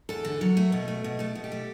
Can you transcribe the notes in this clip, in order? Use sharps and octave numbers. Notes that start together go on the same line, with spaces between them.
E2 A4
D3
F#3
A3
B2
A3
B2
A3 A4
B2
G4
A3